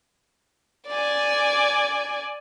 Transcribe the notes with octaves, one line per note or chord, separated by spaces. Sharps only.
D5 G#5